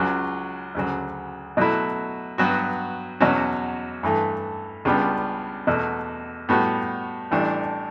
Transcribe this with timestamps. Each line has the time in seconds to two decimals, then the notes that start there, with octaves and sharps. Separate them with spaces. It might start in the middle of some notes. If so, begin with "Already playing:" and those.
Already playing: C#2 C#3 F#3
0.75 D2 C#3 F#3
1.57 B2 F#3 A3 E4
2.38 G2 F#3 B3 F#4
3.20 E2 B2 F#3 C#4 F#4
4.03 G2 E3 A3
4.85 C#2 C#3 G3 B3 D4
5.67 E2 B2 A3
6.49 A2 G3 B3 F#4
7.31 A1 A2 E3 G3 D4